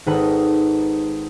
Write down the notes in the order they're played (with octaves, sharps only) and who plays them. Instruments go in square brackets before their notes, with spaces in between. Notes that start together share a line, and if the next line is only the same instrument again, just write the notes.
[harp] G#1 D#4 A4 B4 F#5 B5